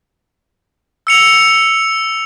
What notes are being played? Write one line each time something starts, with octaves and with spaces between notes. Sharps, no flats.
E6 C#7 F7